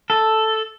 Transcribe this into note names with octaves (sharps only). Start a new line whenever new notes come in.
A4